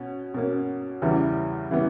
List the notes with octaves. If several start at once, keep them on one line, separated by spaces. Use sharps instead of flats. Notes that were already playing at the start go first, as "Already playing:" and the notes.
Already playing: B2 C#4
B2 A#3 C#4
E2 C#3 E3 G3 B3
C#3 E3 G3 B3